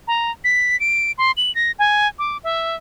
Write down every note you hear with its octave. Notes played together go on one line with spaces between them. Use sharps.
A#5
B6
D7
C6
F#7
A#6
G#5
D6
E5